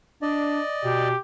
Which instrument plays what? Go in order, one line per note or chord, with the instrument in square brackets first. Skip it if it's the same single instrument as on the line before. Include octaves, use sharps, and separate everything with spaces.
[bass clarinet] D4 [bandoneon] D5 D#5
[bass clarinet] B2 [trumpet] G4